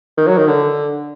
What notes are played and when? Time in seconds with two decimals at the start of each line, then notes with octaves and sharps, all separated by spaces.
0.17 D#3
0.28 F#3
0.38 D#3
0.48 D3